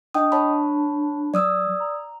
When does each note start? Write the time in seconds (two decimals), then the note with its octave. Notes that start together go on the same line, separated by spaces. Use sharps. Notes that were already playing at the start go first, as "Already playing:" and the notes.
0.14 D4 D#5 G5 D#6
0.32 C#5 A5 B5
1.34 F#3 D5 D#6 E6
1.80 A#5